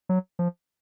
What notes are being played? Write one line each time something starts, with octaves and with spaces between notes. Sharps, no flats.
F#3
F3